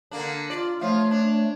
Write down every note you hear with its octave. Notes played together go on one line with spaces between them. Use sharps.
D3 A#3 D4
F4 D5
F3 A3 F4 C#5
D4